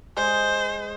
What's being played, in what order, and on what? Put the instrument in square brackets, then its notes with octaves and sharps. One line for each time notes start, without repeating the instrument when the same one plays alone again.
[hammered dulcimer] G#3 [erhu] C5